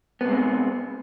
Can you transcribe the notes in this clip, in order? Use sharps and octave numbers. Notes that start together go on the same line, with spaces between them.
C3 G#3 B3 C4